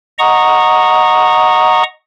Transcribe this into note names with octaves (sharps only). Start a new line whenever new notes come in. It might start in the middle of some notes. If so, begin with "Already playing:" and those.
D#5 F#5 A#5 C#6 D#6